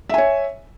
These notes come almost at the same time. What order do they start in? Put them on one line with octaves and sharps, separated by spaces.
E5 G#5 C#5